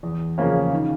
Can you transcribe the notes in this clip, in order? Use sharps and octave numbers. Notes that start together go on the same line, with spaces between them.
E2
C#3 F3 A#3 C#4
D#3